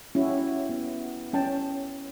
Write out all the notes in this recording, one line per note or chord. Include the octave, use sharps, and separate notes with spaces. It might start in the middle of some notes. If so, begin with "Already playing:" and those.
C#4 E4 F#4 G4
B3
C#4 G5 A5